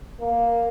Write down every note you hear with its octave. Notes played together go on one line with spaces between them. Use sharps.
A#3